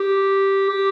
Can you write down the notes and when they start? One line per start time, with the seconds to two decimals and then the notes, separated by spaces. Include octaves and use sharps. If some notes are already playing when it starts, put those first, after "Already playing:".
Already playing: G4
0.69 G4